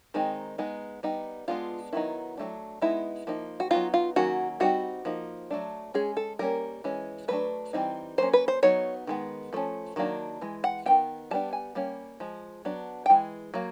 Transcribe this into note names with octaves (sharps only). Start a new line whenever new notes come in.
D#3 G#3 C4 D#4
G#3 B3 D#4
G3 B3 D#4
G#3 B3 D4 F4
D#3 F#3 B3 D#4 E4
F#3 A3 D4
G#3 B3 D#4 E4
F3 A#3 D#4
F#4
F#3 B3 D#4 F4
F4
D#3 F#3 A#3 C#4 F#4
G3 C4 D#4 F#4
F3 A#3 D#4
F#3 A3 D4
G#3 C#4 G#4
A4
G3 A#3 C#4 A#4
E3 G#3 C#4
F#3 A3 D4 B4
E3 G3 C4 D#4
F#3 A#3 C#4 C5
B4
C5
F#3 B3 D#4 C#5
D#3 G#3 B3
F3 A3 C#4
D#3 F#3 A#3 D4
E3 G#3
F#5
D#3 F#3 B3 G5
G3 B3 D4 A5
G#5
G3 A#3 C#4
F3 G#3
F#3 B3 D4
G5
E3 G#3
F#3 A#3